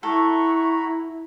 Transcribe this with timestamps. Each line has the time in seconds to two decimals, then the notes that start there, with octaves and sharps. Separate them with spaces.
0.03 E4 A4 F#5 A#5 B5 C#6